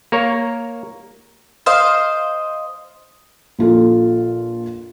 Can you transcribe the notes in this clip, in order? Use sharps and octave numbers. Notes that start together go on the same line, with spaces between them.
A#3 A#4 C#5
C5 D#5 F5
A#1 F4 A4